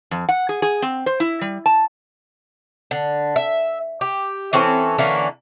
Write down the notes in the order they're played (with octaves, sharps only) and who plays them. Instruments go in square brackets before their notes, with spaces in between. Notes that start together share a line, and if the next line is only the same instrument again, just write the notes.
[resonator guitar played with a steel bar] F2
F#5
G#4
G#4
C4
C5
E4
G3
A5
[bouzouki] D3
E5
G4
E3 C4 C#4 A4
D3 E3 A#3 C#4